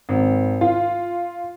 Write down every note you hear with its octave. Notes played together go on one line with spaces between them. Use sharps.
G#1
F4